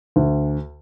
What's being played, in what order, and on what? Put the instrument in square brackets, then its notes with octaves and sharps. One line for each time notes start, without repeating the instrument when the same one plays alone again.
[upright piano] D2